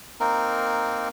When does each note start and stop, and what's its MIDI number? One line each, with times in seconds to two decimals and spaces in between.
0.20 1.09 58
0.20 1.09 60
0.20 1.09 63
0.20 1.09 70